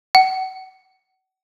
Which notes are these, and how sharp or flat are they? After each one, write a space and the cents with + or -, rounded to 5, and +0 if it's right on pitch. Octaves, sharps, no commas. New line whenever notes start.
F#5 +35